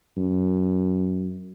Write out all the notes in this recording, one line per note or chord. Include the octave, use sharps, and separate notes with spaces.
F#2